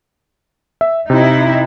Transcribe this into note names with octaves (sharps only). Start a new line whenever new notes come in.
E5
C3 D#4 E4